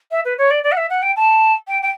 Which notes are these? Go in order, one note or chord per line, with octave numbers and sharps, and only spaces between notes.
E5
B4
C#5
D5
D5
F#5
E5
F#5
G5
A5
G5
G5